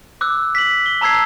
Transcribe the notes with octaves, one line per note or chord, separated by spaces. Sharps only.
D6 E6 F#6
B6 F#7
G7
A5 A#5 E6 G#6 C7